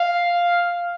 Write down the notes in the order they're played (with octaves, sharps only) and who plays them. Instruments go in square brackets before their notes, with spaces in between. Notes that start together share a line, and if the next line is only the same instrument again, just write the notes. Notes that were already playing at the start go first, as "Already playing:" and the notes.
Already playing: [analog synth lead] F5